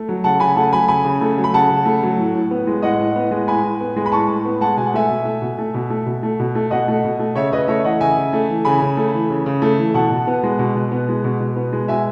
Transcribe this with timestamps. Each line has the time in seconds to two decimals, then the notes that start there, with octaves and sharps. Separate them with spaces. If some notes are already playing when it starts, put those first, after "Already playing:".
Already playing: A3
0.09 F#3
0.24 C#3 F#5 A5
0.40 C#3 G#5 B5
0.56 A3 F#5 A5
0.72 F#3 G#5 B5
0.88 C#3 G#5 B5
1.05 C#3
1.21 A3
1.37 F#3
1.44 B5
1.54 C#3 F#5 A5
1.70 C#3
1.85 A3
2.03 F#3
2.18 A2
2.35 A2
2.51 B3
2.67 G#3
2.82 A2 D#5 F#5
2.99 A2
3.16 B3
3.31 G#3
3.47 A2 G#5 B5
3.63 A2
3.81 B3
3.96 G#3
4.06 B5
4.12 A2 A5 C#6
4.28 A2
4.45 B3
4.61 G#3 F#5 A5
4.77 B2 G#5
4.86 F#5
4.94 A3 E5 G#5
5.10 B2
5.25 A3
5.42 B2
5.58 A3
5.74 B2
5.90 A3
6.06 B2
6.23 A3
6.39 B2
6.55 A3
6.71 B2 D#5 F#5
6.88 A3
7.04 B2
7.19 A3
7.35 C#3 C#5 E5
7.51 C#3 B4 D#5
7.68 A3 C#5 E5
7.84 E3 D#5 F#5
8.00 C#3 E5 G#5
8.17 C#3
8.33 A3
8.49 E3
8.65 C#3 G#5 B5
8.82 C#3
8.97 A3
9.14 E3
9.30 C#3
9.46 C#3
9.62 A3
9.78 E3
9.94 B2 F#5 A5
10.11 B2
10.27 B3
10.43 G#3
10.59 B2
10.75 B2
10.91 B3
11.09 G#3
11.24 B2
11.40 B2
11.56 B3
11.73 G#3
11.88 B2 E5 G#5